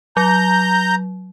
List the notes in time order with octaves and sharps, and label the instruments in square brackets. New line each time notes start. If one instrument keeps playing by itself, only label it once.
[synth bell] F#3 [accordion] A#5 G6